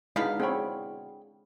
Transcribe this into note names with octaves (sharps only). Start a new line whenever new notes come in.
B2 D3 G#3 D#4 E4 F5 B5
C4 G#4 C#5 G5 B5